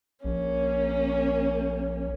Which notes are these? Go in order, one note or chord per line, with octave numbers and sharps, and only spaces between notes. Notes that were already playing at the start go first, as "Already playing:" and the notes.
A#1 A#3 C#4